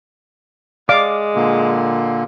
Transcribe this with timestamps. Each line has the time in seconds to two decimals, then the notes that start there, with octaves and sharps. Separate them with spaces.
0.89 G#3 D5 F5 D6
1.35 A#2 D3 A#3